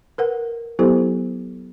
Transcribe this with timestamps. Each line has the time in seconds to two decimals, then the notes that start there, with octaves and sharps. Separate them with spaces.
0.18 A#4 B4 F#5
0.79 F#3 B3 E4 G4 A4 C5